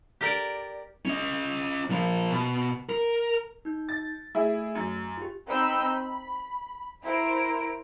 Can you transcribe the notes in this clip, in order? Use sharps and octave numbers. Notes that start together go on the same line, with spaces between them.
G4 A#4 D5
C#4 D#5
F3 A#3
B2
A#4
D#4 G6
A6
A3 E4 G#4 E5
F#2
F4 G4
C4 D#4 B5 E6 G6
B5
E4 A#4 C5 A#5 D7